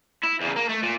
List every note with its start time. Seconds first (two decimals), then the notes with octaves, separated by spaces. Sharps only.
0.23 E4
0.40 E2 C#3
0.56 A#3
0.69 A3
0.82 A#2